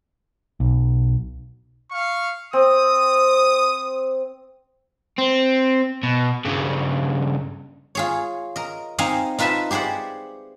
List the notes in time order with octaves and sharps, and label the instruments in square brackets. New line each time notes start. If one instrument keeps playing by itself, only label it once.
[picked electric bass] B1
[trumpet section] F5 C#6
[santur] C4 [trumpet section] D#6
[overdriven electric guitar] C4
B2
G2 C#3
[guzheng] F4 G#4 C#5
A#4 D#5
C4 D#4 D#5 F5 G#5
D#4 F4 B4 E5 A5
G4 G#4 C5 D5 F#5